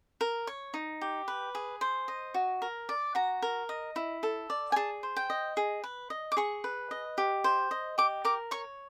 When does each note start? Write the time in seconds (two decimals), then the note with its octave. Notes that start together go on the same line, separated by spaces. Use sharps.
0.21 A#4
0.47 C#5
0.74 D#4
1.01 G4
1.28 B4
1.55 G#4
1.81 C5
2.08 D#5
2.34 F#4
2.62 A#4
2.89 D5
3.15 F#4 A#5
3.42 A#4
3.69 D#5
3.96 E4
4.23 A4
4.50 D5
4.72 G#5
4.76 G#4 A5
5.03 C5
5.16 G5
5.30 D#5
5.57 G#4
5.84 B4
6.10 D#5
6.32 D6
6.37 G#4 C#6
6.64 B4
6.91 D#5
7.18 G4
7.44 C5
7.71 D#5
7.98 G4 D6
8.25 A#4 D6
8.51 C#5 C#6